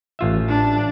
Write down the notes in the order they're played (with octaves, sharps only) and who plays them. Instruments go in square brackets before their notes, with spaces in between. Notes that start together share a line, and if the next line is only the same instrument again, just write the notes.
[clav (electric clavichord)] A1 F4 E5
[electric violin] D4